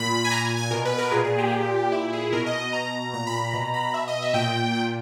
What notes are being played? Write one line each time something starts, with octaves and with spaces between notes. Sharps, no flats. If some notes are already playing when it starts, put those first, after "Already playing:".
Already playing: A#2 B5
G#5
A#2 A#5
G#5
G#5
B2 A#4
B4
A#4
A#2 G#4
G#4
G4
A#2
A#2 E4
G#4
B2 A#4
D#5
D#5
B2 A#5
A#2 A#5
B5
B5
B2 A#5
B5
B2 E5
D#5
E5
A#2 G5
A#2 G5